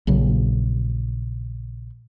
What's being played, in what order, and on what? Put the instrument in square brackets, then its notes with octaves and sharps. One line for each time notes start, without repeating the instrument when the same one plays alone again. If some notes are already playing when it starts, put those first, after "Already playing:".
[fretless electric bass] A#1 C#3 F#3